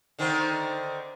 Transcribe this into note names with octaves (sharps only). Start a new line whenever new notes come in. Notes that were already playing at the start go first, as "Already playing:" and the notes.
D3 D#3 C4